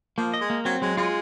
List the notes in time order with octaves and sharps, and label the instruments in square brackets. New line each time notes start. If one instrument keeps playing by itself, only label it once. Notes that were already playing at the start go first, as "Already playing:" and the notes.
[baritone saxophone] F3 [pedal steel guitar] A#3
[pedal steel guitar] D#5
[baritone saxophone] G#3
[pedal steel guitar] A#3
[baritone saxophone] F#3 [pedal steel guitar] C4
[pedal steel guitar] F#3 [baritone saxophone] G#3
[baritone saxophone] G#3 [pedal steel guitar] F4